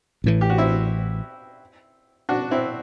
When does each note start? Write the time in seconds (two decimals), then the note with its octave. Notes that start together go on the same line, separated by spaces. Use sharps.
0.24 A1 A2 E3
0.41 G4
0.50 F#4
0.58 C4 E4
2.29 D4 F#4
2.51 C4 E4